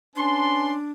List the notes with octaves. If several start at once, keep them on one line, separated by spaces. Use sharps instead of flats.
C#4 D4 B4 A5 C6